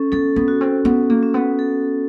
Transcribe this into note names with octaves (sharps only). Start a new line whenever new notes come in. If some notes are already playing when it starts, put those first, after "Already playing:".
Already playing: C#4 A4
B3 A4
B3
F#4
C4
B3 C#4
A#3
C#4
B3
A4